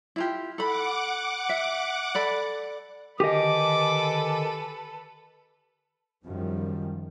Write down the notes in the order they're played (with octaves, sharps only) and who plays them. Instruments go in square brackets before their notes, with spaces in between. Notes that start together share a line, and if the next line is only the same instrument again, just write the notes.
[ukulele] E4 F4 G4
[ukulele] A4 B5 [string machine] F#5 D6
[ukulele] E5
A4 D5 B5
[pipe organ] D3 D#3 G#5 [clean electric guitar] G4 D#5 [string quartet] A4 B4 [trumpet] D6
[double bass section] F#2 D#3 F3 G3